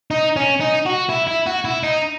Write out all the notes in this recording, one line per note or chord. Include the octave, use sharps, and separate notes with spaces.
D#4
C#4
D#4
F#4
E4
E4
F#4
E4
D#4